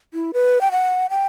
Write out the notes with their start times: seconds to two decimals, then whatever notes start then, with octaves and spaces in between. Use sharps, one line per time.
0.14 E4
0.34 B4
0.61 G5
0.71 F#5
1.10 G5